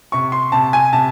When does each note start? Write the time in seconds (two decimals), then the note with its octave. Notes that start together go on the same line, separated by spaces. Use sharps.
0.12 C3 C#6
0.32 C6
0.52 C3 A5
0.73 G#5
0.93 C3 A5